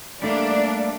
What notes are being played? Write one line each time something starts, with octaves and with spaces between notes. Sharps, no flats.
G3 A3 A#3 D4